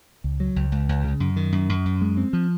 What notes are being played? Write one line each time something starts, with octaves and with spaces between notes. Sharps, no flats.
C#2
F#3
C#2
C#2
C#2
C#3
F#2
D#3
F#2
F#2
F#2
G#3
C4
F3